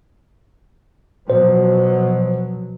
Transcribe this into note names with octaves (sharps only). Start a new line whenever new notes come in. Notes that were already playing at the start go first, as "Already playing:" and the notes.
B2 F3 F#3 C5